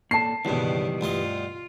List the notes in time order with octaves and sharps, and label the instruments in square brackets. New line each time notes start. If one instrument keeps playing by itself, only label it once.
[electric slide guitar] A#2 A4 [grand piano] A5 C7
[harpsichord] C#2 G2 [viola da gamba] B2 D#3 [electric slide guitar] E3 G3
[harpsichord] D2 G2 D#5 [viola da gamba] F4